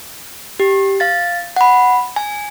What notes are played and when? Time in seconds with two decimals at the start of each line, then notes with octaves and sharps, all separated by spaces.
0.60 G4
1.00 F5 A6
1.56 F#5 B5
2.16 G#5